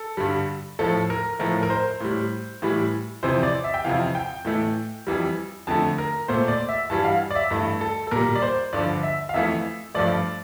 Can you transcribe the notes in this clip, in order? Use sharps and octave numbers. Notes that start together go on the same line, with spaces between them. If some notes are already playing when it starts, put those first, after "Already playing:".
Already playing: A4
G2 D3 G3
A2 F3 A3 A4
A#4
A2 F3 A3 A#4
A#4
C5
A2 G3
A2 E3 G3
F2 C3 E3 C5
D5
E5
G5
F2 C3 E3 F5
G5
A2 E3 A3
F2 E3 G3
F2 D3 A3 A5
A#4
A#2 A3 C5
D5
E5
G2 E3 G3 A5
F5
D5
E5
G2 E3 A3
A4
A4
A#2 G3 A#4
D5
C5
G2 D3 F3 D5
E5
F5
F2 E3 A3 E5
G2 F3 A3 D5